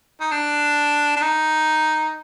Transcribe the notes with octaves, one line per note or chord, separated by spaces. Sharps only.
D#4
D4
D4
D#4